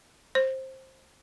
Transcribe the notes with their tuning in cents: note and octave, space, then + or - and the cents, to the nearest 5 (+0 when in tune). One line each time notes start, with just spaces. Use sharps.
C5 +15